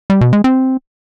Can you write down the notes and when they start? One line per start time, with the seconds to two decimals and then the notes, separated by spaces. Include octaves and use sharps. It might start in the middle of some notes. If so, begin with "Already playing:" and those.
0.10 G3
0.21 B2
0.33 G#3
0.44 C4